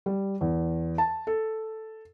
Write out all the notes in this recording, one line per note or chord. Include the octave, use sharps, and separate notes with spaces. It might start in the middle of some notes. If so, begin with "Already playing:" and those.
G3
E2
A5
A4